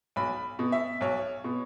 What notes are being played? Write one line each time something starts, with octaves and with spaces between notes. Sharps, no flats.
B1 B5
B2
E5
B1 C#5
B2